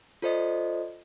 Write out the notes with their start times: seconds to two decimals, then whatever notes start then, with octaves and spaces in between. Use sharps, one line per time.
0.22 F4 A4 C5 D5 D#5